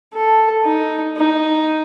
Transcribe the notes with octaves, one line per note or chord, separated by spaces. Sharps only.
A4
D#4
D#4